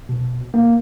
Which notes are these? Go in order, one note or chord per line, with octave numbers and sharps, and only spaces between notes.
B2
A#3